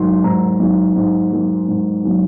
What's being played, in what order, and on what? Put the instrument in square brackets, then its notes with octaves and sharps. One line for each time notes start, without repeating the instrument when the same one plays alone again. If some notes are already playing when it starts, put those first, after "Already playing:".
Already playing: [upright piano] G#2 D#3 F#3 C6
G#2 A#5
D#3 F#3
G#2
D#3 F#3
G#2
D#3 F#3